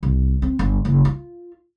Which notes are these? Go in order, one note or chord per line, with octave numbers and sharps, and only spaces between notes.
C2
C4
G1
F#1
F4